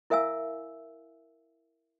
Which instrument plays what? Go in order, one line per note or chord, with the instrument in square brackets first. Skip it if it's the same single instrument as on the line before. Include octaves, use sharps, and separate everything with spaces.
[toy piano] E4 A#4 E5 F5 G#5 E6